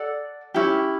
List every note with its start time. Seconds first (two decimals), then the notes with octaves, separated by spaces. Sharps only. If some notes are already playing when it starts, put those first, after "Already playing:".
Already playing: A4 D5 F#5
0.54 C#4 E4 G4